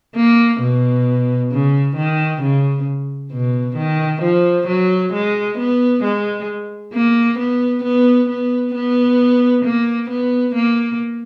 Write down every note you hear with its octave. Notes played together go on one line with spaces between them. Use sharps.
A#3
B2
C#3
D#3
C#3
B2
D#3
F3
F#3
G#3
B3
G#3
A#3
B3
B3
B3
B3
A#3
B3
A#3